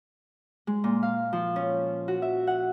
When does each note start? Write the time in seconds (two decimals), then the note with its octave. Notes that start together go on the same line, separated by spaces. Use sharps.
0.67 G#3
0.84 A#2
1.03 F5
1.33 F3
1.56 C#4
2.08 F#4
2.22 E5
2.47 F#5